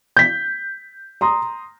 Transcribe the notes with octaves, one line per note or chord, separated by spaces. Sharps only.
G6 B6
A#5 C6 D#6